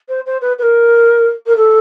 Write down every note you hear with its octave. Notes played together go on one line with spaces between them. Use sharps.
C5
C5
B4
B4
A#4
A#4
A4